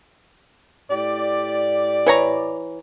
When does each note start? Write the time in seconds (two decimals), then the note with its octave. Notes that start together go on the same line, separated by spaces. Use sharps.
0.91 A2 G4 D5
2.06 E3 C#5 A#5